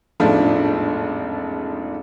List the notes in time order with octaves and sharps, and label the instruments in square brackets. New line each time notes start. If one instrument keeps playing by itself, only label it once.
[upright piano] E1 A1 G#2 F3 A3 D4